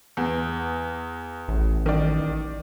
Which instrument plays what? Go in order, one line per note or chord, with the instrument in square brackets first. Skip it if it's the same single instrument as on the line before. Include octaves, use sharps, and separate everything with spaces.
[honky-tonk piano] E2
[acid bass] A1
[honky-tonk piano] D#3 D5